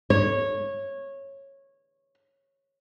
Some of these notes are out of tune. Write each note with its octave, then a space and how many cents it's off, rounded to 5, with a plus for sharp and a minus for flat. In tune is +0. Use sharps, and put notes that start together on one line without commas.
C#5 -15